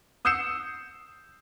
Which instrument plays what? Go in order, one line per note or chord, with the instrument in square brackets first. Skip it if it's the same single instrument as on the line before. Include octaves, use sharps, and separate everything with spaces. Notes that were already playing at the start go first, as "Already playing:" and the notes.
[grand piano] D#6 E6 G6 C7 C#7 E7